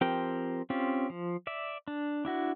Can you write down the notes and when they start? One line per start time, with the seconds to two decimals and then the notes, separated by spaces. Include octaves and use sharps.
0.01 F3 C4 G4 A#4 G5
0.70 C4 C#4 F4 G4
1.10 F3
1.47 D5 E5
1.88 D4
2.25 D4 E4 F#4